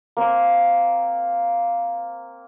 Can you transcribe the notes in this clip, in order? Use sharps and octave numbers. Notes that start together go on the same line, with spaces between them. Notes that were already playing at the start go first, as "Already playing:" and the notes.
A#3 C4